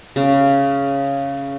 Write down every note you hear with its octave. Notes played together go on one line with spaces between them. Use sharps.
C#3